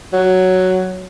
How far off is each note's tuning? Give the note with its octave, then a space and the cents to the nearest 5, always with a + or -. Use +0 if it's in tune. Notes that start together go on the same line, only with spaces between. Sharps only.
F#3 +5